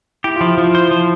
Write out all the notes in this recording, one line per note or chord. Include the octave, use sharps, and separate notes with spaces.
E4 G4
F4
F3 E4
F3 F4
C5
F3